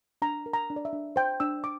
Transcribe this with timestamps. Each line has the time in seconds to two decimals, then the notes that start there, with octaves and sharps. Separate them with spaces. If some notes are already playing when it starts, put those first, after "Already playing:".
0.22 D4 A#5
0.46 A#4
0.53 A#5
0.70 D4
0.76 D5
0.85 E5
0.93 D4
1.16 C5 G5
1.40 D4 E6
1.64 D6